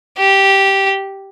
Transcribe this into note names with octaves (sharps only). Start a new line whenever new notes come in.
G4